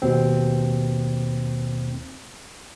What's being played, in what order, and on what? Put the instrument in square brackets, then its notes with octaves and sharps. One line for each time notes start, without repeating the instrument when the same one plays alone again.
[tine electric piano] D#2 B2 C4